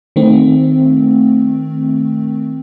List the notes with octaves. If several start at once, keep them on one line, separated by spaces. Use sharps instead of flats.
D#3 A3 C4